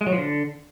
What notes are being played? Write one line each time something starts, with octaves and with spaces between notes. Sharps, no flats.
G#3
F#3
F3
D3